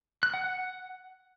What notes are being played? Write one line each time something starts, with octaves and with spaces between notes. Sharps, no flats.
F#6
F#5
F#5